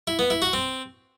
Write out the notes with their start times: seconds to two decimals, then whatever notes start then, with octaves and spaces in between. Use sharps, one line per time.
0.07 E4
0.19 B3
0.30 E4
0.42 F#4
0.53 C4